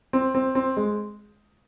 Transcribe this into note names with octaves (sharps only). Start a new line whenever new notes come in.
C4
C4
C4
G#3